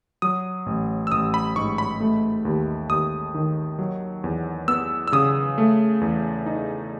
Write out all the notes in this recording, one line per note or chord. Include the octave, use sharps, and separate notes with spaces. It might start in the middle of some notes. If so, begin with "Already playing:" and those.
F#3 D#6
A1
E6
A1 D#6
B5
G#2 C#6
B5
A3
D#2
D#2 D#6
D#3
F#3
E2
B3 E6
E6
C#3 D#6
A3
E2
D#4